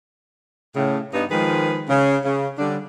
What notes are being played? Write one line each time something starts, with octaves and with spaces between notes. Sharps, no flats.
A2 C#3
G2 B3 D#4
D#3 F3 G#3 G#4 B4
C#3
C#3
D3 G3 D4